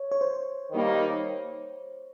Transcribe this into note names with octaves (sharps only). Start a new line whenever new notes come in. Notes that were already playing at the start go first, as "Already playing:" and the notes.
Already playing: C#5
C#5
C5
D#3 G3 A#3 D#4